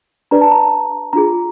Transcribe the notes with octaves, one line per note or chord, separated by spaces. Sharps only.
D4 G4 B4 D5 A#5
A5
A#5
D4 F4 G#4 A#5